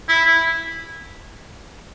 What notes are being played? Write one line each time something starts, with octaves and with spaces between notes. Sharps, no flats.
E4
E4